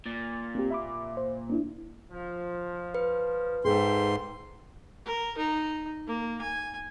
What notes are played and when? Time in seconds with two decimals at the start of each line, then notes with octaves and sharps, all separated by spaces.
0.06 A#2 A6
0.55 A#3 C4 G4
0.70 E5 B5 D6
1.17 C5
1.50 A#3 D4 E4
2.10 F3
2.94 B4
3.65 G#2 G#4 A4 E5 G5 C6
5.05 A#4
5.38 D#4
6.07 A#3
6.41 G#5